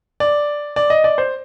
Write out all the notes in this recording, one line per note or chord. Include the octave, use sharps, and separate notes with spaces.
D5
D5
D#5
D5
C5